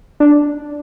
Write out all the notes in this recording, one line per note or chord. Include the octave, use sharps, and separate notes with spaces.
D4